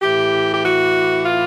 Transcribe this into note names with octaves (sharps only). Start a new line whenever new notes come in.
A2 E3 G4
G4
F#4
F4